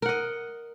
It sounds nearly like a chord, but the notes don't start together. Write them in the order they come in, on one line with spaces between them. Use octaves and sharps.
A#4 F#5 D#5